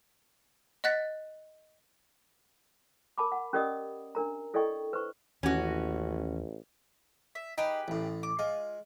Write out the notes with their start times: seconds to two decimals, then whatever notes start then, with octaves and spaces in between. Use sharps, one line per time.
0.84 D#5 F#5 F#6 A6 B6
3.18 A#4 A5 B5 D6
3.32 F#5
3.53 C#4 G4 A#4 D5 D#5 D#6
4.15 D4 A#4 A#5
4.54 E4 A4 D5 D#5 G5 C#6
4.93 B4 C5 C#6
5.43 A1 D#2 E3 C#4 F#4
7.35 E5
7.58 D#4 G4 G#4 B4
7.88 A1 A2
8.23 D6
8.39 G#3 F4